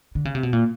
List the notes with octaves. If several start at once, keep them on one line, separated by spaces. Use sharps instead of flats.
D3
C#3
C3
B2
A#2